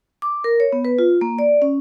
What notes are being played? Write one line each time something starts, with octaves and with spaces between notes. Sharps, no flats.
D6
A#4
C#5
B3
B4
F4
A#3
D5
C#4